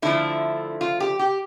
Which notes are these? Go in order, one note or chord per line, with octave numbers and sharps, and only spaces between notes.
D3 F3 A3 E4
F4
G4
G4